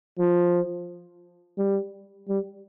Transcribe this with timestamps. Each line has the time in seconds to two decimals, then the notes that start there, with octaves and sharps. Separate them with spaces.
0.18 F3
1.58 G3
2.28 G3